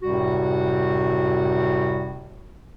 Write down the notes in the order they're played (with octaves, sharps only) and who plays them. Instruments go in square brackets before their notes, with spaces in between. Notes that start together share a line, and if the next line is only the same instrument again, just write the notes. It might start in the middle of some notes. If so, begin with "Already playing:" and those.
[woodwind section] F#2 A2 C3 G3 F#4